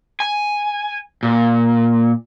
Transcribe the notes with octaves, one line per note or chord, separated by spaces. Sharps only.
G#5
A#2